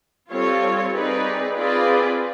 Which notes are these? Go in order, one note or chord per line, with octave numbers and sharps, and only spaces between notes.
G3 C4 F4 A4 C#5
C4 D#4 G#4 B4 D5
C4 F4 G#4 B4 D5